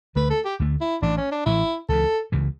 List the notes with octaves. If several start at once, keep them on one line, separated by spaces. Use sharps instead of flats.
D2 D3 A3 B4
A4
G4
D2 D3 A3
E4
A1 A2 E3 D4
C#4
D4
A1 A2 E3 E4
C#2 C#3 E3 A4
C#2 C#3 E3